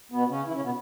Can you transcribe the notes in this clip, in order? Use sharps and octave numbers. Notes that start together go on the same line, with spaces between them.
B2 B3
C#3 C#4
E3 E4
C#3 C#4
B2 B3